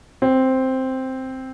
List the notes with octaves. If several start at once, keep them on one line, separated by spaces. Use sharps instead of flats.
C4